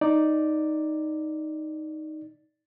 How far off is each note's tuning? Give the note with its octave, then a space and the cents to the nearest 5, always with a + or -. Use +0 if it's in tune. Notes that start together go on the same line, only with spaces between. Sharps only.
D#4 +0 D5 +0